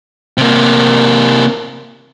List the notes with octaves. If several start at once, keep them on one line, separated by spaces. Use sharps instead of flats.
C3 A#3